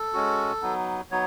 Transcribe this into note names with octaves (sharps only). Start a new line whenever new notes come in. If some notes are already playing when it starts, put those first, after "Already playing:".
Already playing: A4
G#3 C#4 F#4
F#3 B3 D#4
F#3 B3 D#4 C#5